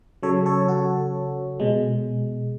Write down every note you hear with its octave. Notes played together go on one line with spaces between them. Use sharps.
C#3 F#3 A4 C#5
A4 C#5
F#4 A4
B2 G#3